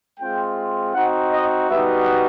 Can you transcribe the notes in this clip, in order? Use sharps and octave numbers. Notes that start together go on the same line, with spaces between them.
G#3 C4 F4 G5
C4 D#4 F#4 F#5
D#5
G3 B3 D#4 F#4 E5